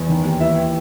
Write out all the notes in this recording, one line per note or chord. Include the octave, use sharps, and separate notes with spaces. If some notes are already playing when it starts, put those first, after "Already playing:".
Already playing: E2
D#3
D#2
E3 E5